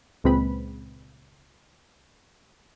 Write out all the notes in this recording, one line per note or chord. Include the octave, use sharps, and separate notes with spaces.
C#2 A#2 G#3 C4 B4 B5